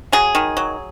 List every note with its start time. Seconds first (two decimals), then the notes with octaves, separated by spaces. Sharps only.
0.12 F#3 G#4
0.35 D#3
0.57 F#3